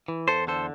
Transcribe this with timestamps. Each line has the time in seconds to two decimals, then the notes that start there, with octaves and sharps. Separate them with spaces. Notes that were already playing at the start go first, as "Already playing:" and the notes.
0.08 E3
0.28 E2 A4 C5
0.47 D3 A4 C5